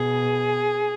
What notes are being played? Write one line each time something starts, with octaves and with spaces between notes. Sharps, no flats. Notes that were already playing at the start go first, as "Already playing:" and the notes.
Already playing: B2 G#4